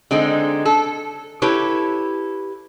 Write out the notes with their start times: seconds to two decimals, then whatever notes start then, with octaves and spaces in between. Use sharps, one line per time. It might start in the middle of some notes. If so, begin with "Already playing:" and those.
0.11 D3 G#3 C4 D#4
0.65 A4
1.42 E4 G4 A4 B4 C#5